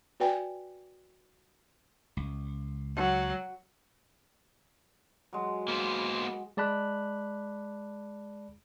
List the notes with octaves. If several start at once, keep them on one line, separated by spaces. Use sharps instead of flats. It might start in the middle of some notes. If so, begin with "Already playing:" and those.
F#4 B4 D5 G5 G#5
C#2
F#3
F#3 G#3
A#3 B3 C5
G#3 D5 A5 B5 F#6